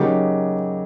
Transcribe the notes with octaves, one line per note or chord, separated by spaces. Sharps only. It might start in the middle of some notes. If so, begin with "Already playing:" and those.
Already playing: C#3 F#3 A#3 D#4 G4